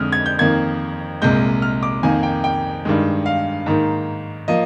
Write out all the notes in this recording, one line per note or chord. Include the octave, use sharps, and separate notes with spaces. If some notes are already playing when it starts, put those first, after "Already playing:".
Already playing: F2 D3 G#3 D#6 F6
G#6
G6
F2 D#3 A#3 G#6
C2 A#2 G#3 G6
F6
D6
F2 D#3 A#3 G#5
G5
G5
G2 D#3 G#3
F5
G#2 D#3 A#3
F3 A#3 D#5